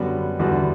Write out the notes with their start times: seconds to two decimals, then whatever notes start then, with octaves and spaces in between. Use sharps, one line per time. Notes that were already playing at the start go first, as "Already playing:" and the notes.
Already playing: F#2 D3 G3 B3 F#4
0.39 E2 D3 G3 B3 F#4